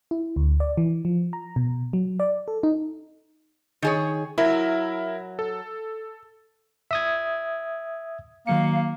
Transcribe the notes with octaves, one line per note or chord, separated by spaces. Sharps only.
E4
D2
D5
E3
F3
A#5
B2
F#3
D5
A4
D#4
D#3 G#4 C#5
F#3 E4 A#4 E5
A4
E5 D#6 G#6
D#3 F#3 A#3 F5 C#7